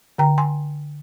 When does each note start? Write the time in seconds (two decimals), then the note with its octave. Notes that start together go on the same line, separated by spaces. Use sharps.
0.18 D3 G5 A#5
0.38 G#5 C6